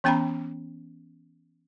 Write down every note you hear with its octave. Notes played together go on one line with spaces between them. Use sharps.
E3 B3 C#4 G5 A#5 B5